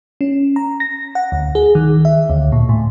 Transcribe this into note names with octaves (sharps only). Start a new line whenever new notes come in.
C#4
A#5
A#6
F#5
D2
G#4
D#3
E5
D2
A#2
A2